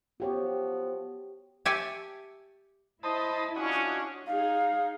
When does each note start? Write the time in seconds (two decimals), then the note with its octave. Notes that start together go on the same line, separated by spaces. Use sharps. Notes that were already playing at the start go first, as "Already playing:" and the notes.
0.20 F3 B3 F#4 G4 C#5
1.65 G4 C#5 E5 G#5 A5
3.03 E4 C5 D#5 A5 B5 D#6
3.56 C#4 D4 F4 F#4 C#5 D#5
4.27 D#4 G#4 F5